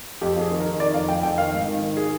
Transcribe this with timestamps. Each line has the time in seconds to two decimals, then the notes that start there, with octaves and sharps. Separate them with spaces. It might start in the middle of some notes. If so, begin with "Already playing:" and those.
0.21 F2 G4
0.36 F2
0.41 G#4
0.51 D#3
0.60 A#4
0.66 D#3
0.80 D#3 D5
0.94 F2 F5
1.09 F2 G5
1.23 F2 G5
1.38 D#3 F5
1.53 G#2
1.68 D#3
1.82 D#3
1.97 G#4